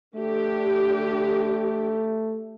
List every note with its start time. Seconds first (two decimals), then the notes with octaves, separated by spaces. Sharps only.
0.15 D3 A3 G4